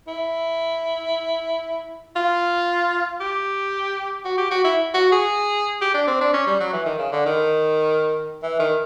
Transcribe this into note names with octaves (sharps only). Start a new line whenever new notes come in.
E4
F4
G4
F#4
G4
F#4
E4
F#4
G#4
G4
D4
C4
D4
C#4
G3
F#3
E3
D#3
C#3
D3
D#3
E3
D#3